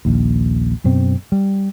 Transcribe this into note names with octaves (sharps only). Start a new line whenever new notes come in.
A#1 D#2
F#2 B2 C4
G3